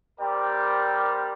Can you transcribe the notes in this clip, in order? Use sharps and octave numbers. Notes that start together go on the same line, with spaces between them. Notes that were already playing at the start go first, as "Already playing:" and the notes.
G3 C4 G4 A#4 D5